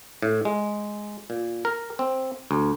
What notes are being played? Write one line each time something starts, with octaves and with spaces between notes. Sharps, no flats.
A2
G#3
A#2
A#4
C4
D2